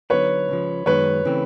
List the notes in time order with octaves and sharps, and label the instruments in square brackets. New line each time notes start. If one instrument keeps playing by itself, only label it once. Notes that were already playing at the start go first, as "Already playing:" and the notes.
[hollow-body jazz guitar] D3 F#3 B3 D#4 [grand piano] B4 C#5
[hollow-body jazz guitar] C#2 C#3 F3
[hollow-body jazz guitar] F#2 D#3 G#3 B3 [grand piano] B4 C#5
[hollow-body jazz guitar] C#3 E3 A3 C4